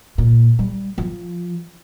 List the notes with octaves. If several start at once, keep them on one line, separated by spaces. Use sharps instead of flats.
A#2
G3
F3